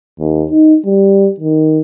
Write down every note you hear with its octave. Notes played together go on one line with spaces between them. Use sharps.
D#2
D#4
G3
D#3